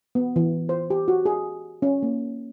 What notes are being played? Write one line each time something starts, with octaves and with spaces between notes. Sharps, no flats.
B3
E3
C5
G4
F#4
G#4
C#4
A#3